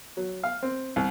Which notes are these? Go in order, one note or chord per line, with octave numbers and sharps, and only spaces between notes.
F#3
F5
C4
C2